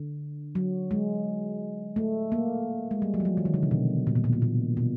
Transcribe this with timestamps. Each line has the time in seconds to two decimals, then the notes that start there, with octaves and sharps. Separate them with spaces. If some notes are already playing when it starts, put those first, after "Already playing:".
Already playing: D3
0.55 F#3
0.91 G#3
1.96 A3
2.32 A#3
2.91 G#3
3.02 G3
3.14 F#3
3.20 F3
3.25 F#3
3.37 E3
3.45 D#3
3.54 D3
3.63 C3
3.71 B2
4.07 A#2
4.15 B2
4.24 A#2
4.33 B2
4.42 A#2
4.77 B2